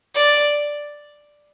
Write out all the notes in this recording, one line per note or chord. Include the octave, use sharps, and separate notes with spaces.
D5